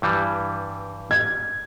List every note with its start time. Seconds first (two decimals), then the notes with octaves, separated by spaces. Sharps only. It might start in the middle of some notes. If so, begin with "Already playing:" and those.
0.02 G2 E3 G3
1.11 G#6